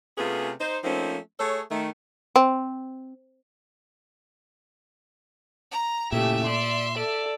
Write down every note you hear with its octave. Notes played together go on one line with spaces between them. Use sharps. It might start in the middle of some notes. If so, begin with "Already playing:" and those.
C3 A3 B3 C#4 F4 G#4
D#4 C5
F3 A3 A#3 C4 C#4 D#4
A3 G#4 A4 C#5
D#3 A3
C4
A#5
A#2 C#3 A3 E4 G4 E5
D5 C6
A4 D5